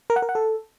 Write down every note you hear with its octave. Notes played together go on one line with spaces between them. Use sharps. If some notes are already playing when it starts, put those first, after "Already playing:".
A#4
F#5
A#4
F#5
A4